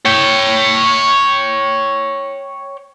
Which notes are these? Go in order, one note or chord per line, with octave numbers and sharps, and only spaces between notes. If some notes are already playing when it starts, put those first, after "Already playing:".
C#5 G5